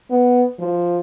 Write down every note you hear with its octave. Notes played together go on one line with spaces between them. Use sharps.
B3
F3